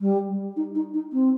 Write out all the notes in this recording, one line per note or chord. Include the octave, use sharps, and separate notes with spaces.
G3
D#4
D#4
D#4
C4